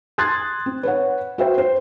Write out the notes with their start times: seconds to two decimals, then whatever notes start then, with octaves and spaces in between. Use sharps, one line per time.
0.18 C6 D#6 F#6 G#6 A6
0.66 C4
0.83 B4 C#5 F#5
1.38 F#4 B4 C5 E5 G5
1.58 C5